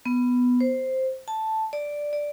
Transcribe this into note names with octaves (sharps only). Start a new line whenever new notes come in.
B3
C5
A5
D5
D5